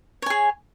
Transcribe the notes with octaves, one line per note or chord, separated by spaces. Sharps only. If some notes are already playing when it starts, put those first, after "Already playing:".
G#4 C#5 G#5